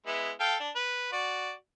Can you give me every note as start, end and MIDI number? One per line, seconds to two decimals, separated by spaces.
0.06 0.31 56
0.06 0.31 59
0.06 0.31 64
0.40 0.55 69
0.40 0.55 77
0.40 0.55 79
0.60 0.70 62
0.76 1.08 71
1.12 1.52 66
1.12 1.52 74